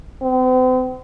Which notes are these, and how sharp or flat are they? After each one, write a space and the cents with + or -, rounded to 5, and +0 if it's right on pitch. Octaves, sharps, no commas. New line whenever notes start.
C4 -40